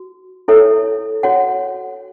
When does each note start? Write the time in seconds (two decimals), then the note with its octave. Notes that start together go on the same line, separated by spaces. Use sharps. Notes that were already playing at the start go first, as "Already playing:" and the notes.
Already playing: F#4
0.48 E4 A4 C#5 E5
1.23 F#4 C#5 F#5